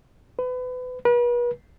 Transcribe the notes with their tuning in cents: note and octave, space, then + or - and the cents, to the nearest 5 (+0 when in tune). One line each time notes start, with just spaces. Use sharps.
B4 +30
B4 -40